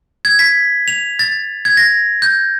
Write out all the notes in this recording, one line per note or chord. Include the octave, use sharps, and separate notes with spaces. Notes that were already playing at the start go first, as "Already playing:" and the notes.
G#6
B6
F7
A6
G#6
A#6
G6